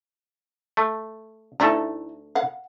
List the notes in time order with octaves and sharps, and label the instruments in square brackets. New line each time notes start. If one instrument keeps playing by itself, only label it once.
[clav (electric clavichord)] A3
[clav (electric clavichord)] D2 A3 A4 [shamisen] D#4 E4 A#5
[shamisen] F5 F#5